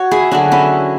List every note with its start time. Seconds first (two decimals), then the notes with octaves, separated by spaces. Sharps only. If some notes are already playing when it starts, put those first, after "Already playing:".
Already playing: F#4 C#5
0.11 E4 G#4
0.31 D3 F#3 C#4 D4 F#4
0.52 C#4 E4